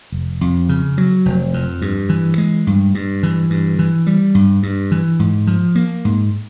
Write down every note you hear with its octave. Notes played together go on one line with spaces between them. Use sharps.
F1
F2
C#3
F#3
F1
F2
G2
E3
G#3
G2
G2
E3
G2
E3
G3
G2
G2
E3
G#2
F3
A#3
G#2